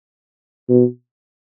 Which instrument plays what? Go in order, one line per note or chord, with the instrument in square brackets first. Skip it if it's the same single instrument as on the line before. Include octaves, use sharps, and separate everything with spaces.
[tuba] B2